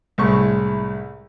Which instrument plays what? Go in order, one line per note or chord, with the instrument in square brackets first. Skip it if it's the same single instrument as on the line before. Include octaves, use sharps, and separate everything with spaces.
[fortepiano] C2 A2 G#3 C#6